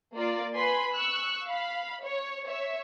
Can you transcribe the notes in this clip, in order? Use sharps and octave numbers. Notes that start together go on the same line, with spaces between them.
A#3 F4 D5
B4 G#5 B5 C6
C#6 E6 F#6
F5 B5
C#5
C#5 E5